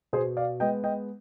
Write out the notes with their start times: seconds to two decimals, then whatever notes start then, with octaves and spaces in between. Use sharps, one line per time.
0.13 B2 G#4 C5
0.37 D5 F5
0.60 G#3 B3 D#5 G5
0.84 D#5 G5